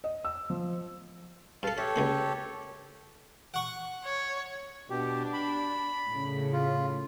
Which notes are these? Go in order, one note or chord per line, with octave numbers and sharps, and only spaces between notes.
D#5
E6
F3
G2 A4 F5 A5
G4 A4 C#5 E5
C#2 D3 A#3
F#5 C#6
C#5
B2 D4 G4
B5
A2 C#3
F4